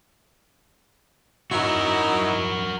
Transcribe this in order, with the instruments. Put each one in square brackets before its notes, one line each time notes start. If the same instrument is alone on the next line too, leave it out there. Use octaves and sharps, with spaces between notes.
[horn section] F#3 D#4 E4 [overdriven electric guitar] F#4 A#4